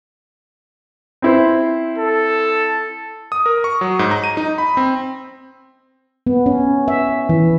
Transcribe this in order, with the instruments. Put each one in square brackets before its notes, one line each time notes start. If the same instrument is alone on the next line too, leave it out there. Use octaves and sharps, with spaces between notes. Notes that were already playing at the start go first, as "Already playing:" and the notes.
[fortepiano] C4 E4 C5
[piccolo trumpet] A4
[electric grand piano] D#6
A#4
C#6
F#3
G#2
A#5
D#7
D#4
B5
C4
[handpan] B3
C#4
E5
E3